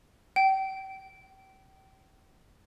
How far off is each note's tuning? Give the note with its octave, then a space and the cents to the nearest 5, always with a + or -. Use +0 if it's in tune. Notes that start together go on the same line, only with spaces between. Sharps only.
G5 -30